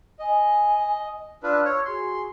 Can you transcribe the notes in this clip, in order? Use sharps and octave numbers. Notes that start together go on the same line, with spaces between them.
D#5 G#5
D4 F4 B4 E6
C#5
F#4 G#4 C6